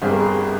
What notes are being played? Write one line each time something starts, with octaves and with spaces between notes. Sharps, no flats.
G1 G2 G3 C4 G#4
A#4
G#4